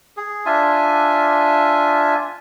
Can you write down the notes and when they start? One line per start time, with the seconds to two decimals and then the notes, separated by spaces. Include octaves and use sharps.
0.17 G#4
0.46 D4 F4 E5 G#5